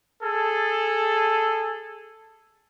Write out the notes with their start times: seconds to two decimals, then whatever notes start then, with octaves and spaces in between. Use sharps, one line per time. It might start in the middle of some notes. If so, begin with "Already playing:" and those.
0.23 G#4 A4